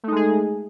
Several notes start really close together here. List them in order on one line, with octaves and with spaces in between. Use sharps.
A3 D#4 G#3 G#4